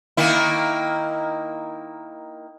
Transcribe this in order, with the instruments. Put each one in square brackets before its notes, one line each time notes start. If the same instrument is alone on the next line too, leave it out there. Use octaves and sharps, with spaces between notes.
[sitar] D#3 A#3 E4